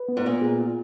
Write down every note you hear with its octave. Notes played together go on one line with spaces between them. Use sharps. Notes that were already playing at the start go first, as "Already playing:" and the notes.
Already playing: B4
B3
G#2
A#2 B3
G#4
F4